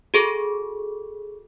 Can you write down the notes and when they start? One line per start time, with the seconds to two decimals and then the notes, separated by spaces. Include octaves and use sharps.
0.14 F#4 G#4 A4